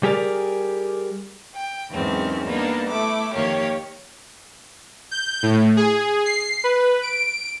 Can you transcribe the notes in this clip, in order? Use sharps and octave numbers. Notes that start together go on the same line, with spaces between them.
G3 G4 G#4 A#4 D5
G5
E2 G#2 D#3 F#3 C4 C#4
G3 A#3 B3 D4 D#4
A3 E4 D6
F2 D#3 A#3 G4 C#5
G6
A2
G#4
C7
B4
D7